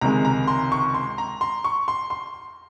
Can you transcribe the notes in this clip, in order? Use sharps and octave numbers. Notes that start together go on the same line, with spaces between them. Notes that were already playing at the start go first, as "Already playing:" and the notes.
C#2 C3 D#3 G#3 A#5
A#5
C6
C#6
C6
A#5
C6
C#6
C6
C6